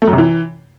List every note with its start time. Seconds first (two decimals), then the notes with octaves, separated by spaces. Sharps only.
0.02 A3
0.07 F#2
0.13 C3
0.18 E3